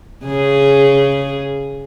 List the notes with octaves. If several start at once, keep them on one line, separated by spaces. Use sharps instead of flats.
C#3 G#4